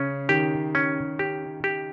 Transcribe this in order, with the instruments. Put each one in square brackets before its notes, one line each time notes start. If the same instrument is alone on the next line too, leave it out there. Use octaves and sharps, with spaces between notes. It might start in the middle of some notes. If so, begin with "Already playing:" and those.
Already playing: [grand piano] C#3 [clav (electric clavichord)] C#4
[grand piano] D#3 [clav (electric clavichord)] G4
[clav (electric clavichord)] C#4
G4
G4